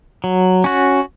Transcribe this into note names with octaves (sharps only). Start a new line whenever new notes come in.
F#3
C#4 F#4